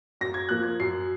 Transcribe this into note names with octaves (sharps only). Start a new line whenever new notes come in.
F#2 A#6
G#6
F3 A#3 F#6
G#6
F#2 C7